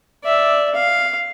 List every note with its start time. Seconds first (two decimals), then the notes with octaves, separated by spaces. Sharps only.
0.24 D5 E5
0.74 F5